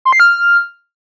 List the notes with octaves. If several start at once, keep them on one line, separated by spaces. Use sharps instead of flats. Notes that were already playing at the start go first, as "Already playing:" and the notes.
C6
C7
F6